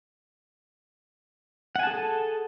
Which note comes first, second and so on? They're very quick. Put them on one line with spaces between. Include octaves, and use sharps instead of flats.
F#5 G#5 A5 G#4 A4